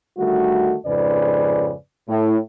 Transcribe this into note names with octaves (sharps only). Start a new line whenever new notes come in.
D3 D#3 G3 A3 F#4
F2 G#2 C#3 B4 D5
A2